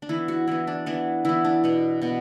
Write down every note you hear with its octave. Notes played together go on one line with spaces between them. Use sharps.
D4
E3 B3 E4
F#4
E3 B3 E4
D4
E3 B3 D4
E3 B3 E4
D4
B2 B3
B2 B3